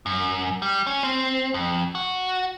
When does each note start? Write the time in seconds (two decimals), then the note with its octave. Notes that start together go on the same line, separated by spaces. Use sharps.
0.06 F#2
0.62 G3
0.87 C#4
1.03 C4
1.54 F2
1.95 F#4